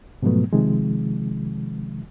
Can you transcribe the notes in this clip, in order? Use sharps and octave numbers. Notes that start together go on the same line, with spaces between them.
G#2 B2 F3 F#3 A3 B3
C3 D#3 F3 G#3